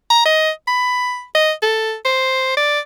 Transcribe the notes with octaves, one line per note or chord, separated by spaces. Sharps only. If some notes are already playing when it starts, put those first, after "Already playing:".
A#5
D#5
B5
D#5
A4
C5
D5